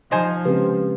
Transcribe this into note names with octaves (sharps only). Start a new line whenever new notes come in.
F3 D#4 C5 G#5
C#3 G#3 C4 G4 B4